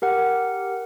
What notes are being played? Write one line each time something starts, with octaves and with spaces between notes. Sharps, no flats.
G4 A#4 F#5